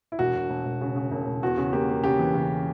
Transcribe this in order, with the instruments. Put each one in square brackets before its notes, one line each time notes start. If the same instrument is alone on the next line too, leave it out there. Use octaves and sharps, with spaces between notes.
[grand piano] E4
[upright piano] E1 [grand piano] F#4
[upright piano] E1
E1
E1
C#3
C#3
E1
E1
[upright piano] E2 [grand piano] F#4
[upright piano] C#3
[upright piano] A#3 [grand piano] G4
[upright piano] A#3
[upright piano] C#3 [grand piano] G4
[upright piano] E3
C#3